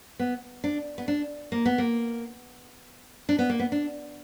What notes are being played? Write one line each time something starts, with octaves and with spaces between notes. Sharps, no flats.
B3
D4
B3
D4
A#3
B3
A#3
D4
B3
A#3
B3
D4